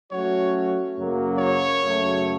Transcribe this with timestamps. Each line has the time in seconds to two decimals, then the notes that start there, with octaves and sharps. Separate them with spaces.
0.11 F#3 A3 C#4 F#4 C#5
0.97 F#2 C#3 F#3 A#3
1.38 C#5
1.82 F#2 C#3 F#3 A3